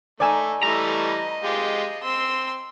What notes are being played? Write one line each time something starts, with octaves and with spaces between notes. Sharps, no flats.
A3 D#4 D5 G#5 E6
E3 G3 A3 D#5 A#5
G#3 F4 G4
C4 C6 E6